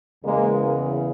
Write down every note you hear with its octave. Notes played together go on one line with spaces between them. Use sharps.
E2 C#3 E3 G#3 A#3